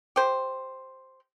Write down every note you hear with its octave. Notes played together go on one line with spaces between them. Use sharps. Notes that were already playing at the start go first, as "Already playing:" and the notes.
G4 C5